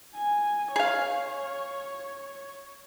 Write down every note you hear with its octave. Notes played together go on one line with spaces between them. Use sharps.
G#5
G#4 C#5 F5